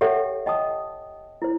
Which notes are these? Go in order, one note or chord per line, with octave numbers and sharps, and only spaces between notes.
G4 A4 C#5 E5 F#5 G5
D#5 G5 A5 D#6
E4 C5